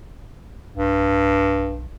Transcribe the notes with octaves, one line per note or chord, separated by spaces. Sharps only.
B1 G2